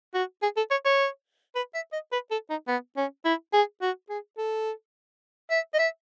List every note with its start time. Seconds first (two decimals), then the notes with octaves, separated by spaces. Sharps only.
0.14 F#4
0.43 G#4
0.57 A4
0.71 C#5
0.85 C#5
1.56 B4
1.75 E5
1.93 D#5
2.12 B4
2.31 A4
2.50 D#4
2.68 B3
2.97 C#4
3.25 E4
3.53 G#4
3.82 F#4
4.09 G#4
4.38 A4
5.51 E5
5.74 D#5
5.79 E5